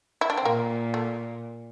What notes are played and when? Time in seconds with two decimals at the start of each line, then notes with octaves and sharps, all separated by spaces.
0.21 E4
0.30 D4
0.38 C4
0.45 A#2 A#3
0.94 A3